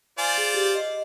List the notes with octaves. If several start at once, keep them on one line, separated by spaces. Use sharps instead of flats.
F4 C5 D5 G#5
G#4
G4
D#5